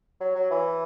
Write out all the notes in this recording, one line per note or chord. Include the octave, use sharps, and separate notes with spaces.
F#3
F#3
E3